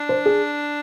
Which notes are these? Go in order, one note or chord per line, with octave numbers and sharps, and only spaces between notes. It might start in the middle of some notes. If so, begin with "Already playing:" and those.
Already playing: D4
C5
G#4